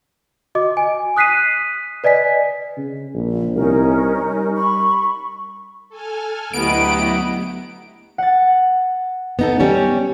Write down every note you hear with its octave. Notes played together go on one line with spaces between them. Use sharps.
F#4 D#5 D6
G#5 D7
D#6 F#6 B6 C7 D#7
B4 D5 D#5 G#5 B6
C#3
A#1
C2 C#4 D#4 A#4
G3
B5 C#6
A4 G#5 F6
D2 F#3 B3 E4 G4 D#5 F#5 D7
F#5 A6
B3 D#4 A4
G3 C#4